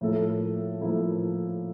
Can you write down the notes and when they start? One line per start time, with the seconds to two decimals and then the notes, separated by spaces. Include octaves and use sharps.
0.01 A2 F3 A#3 E4 A4
0.81 A2 F3 A#3 E4 A4